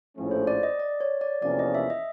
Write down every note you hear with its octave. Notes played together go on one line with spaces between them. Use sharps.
A#1 A2 F3 A3 C#4
C5
D5
D#5
D5
C#5
D5
E2 C3 F3 A#3 C#4 D5
D#5
E5
D#5